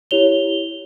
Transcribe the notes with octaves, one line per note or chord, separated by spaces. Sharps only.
E4 G4 C#5 F7 G7